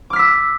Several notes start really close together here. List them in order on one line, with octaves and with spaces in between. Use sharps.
D6 F6 B6 E6